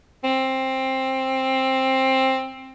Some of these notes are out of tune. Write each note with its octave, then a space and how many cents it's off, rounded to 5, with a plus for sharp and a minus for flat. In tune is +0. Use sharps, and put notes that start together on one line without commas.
C4 +15